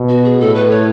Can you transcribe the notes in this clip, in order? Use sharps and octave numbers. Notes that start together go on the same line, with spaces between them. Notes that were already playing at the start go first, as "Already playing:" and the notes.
Already playing: B2
F#4
G#4
A2 A4
B4
C#5